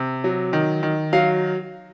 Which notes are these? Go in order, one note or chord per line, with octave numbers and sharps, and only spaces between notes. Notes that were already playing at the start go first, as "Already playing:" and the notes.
Already playing: C3
F#3
D#3
D#3
F#3 F5